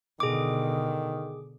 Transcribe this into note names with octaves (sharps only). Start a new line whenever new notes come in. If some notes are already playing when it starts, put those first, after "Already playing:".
B2 D3 D#3 G#4 D6